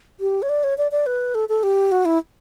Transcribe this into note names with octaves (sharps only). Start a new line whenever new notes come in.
G4
C#5
D5
C#5
D5
D5
B4
A4
A4
G4
F#4
E4